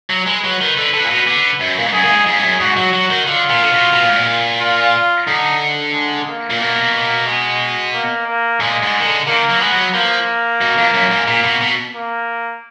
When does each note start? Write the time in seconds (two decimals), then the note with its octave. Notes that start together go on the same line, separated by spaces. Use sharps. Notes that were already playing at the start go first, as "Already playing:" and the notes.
0.10 F#3
0.27 G#3 B4
0.44 F#3
0.61 D#3
0.77 D3
0.94 D3
1.04 A#2
1.10 B2
1.27 D3
1.60 F#2
1.79 A#2
1.86 G#2
1.93 F#2 G#4
2.05 A#2
2.11 G#2
2.27 F2 G#4
2.39 G#2
2.43 F#2
2.60 G#2 F#4
2.77 F#3
2.93 F#3
3.10 D#3
3.27 D3 F4
3.50 A#2
3.63 D3
3.72 B2
3.93 B2
4.02 A#2
4.09 G#2
4.16 A#2
4.61 F4
5.27 D3 D#4
5.94 G#3
6.28 A#3
6.50 A#2
6.60 B2 A#3
6.94 A#3
7.27 G#3
7.93 A#3
8.27 A#3
8.60 A#2 G#3
8.82 G#2
9.00 D#3
9.05 D3
9.27 D#3 A#3
9.50 F#3
9.60 G#3 B3
9.72 F#3
9.94 F3 A#3
10.61 B2
10.78 F2
10.94 F#2
11.10 G#2
11.27 A#2
11.44 B2
11.61 B2
11.94 A#3